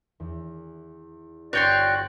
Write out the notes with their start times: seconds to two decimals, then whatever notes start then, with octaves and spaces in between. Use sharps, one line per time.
0.20 E2
1.53 G1 F#4 C#5 D5 G5 C6